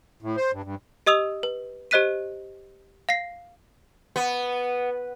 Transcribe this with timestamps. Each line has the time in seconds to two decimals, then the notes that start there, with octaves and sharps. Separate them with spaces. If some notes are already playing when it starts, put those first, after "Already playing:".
0.22 A2
0.36 C5
0.53 G2
0.64 G2
1.06 G4 D#5 D#6 E6 F7
1.43 B4
1.91 G4 C5 D#5 F#6 B6 D#7
3.09 F5 A#6 C7
4.16 B3